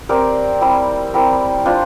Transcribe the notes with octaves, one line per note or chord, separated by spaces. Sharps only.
C4 G4 A#4 D5
G3 C4 E4
C4 E4 G4 A#4
D4 F4 C5 F5